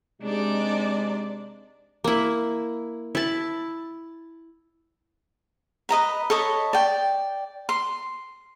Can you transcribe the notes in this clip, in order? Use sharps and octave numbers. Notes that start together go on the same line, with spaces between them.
C3 G#3 D4 D#4 D5
A#3 E4
E4 A5
B4 D#5 A#5 B5
A4 C#5 D#5 B5
D5 G5
C6